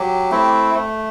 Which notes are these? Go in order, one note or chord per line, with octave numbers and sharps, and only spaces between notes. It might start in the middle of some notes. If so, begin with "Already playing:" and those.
Already playing: F#3 G4
A3 C4 E4
A3